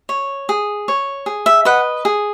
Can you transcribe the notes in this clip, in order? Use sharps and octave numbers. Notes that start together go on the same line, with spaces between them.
C#5
G#4
C#5
G#4
E5
B4 D#5 F#5
G#4